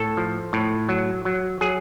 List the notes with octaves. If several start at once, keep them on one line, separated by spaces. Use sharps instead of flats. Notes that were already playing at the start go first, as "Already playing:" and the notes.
Already playing: A2 A4
F3
A2
F#3
F#3
F#3 G#4